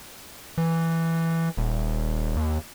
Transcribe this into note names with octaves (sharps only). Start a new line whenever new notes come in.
E3
D#1
D#2